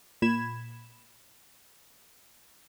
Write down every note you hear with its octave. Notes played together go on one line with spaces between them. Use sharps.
A#2 B5 G#6 E7